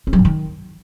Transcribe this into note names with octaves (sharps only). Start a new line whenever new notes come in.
C#4
F#3
G#2
D#3